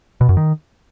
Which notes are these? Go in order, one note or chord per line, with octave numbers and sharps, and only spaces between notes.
B2
F#2
D#3